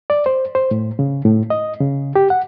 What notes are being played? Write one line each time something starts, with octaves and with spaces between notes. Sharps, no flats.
D5
C5
C5
A2
C#3
A2
D#5
C#3
G4
F#5